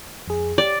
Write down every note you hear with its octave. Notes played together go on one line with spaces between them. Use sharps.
F2 G#4
G4 D5